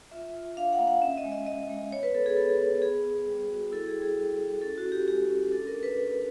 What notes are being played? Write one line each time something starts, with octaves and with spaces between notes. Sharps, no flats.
F4 E5
F4
D4 F5
F#5
A#3 F5
F#5
C#4 E5
D#5
G#3
D#5
G#3 D#5
G#3
B3 C#5
B4
B3 A4
G#4
B3 A4
G#4
B3
B3 G#4
B3
G3
F#4
E4 A4
G#4
G3
G#4
G3
E4
C#4 A4
F#4
C#4
G4
G#3 G4
C#4
D4 A4
A#4
D4
B4
D4